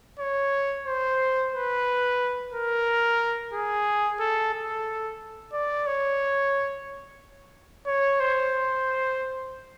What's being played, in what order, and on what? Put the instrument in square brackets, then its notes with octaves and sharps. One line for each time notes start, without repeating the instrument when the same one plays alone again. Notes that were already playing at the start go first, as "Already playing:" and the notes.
[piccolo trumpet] C#5
C5
B4
A#4
G#4
A4
A4
D5
C#5
C#5
C5